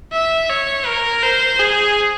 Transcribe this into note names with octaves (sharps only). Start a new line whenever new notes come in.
E5
C#5
A#4
C5
G#4